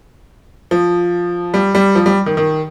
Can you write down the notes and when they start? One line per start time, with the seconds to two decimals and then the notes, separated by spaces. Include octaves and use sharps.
0.71 F3
1.54 G3
1.75 G3
1.95 F3
2.06 G3
2.26 D#3
2.37 D#3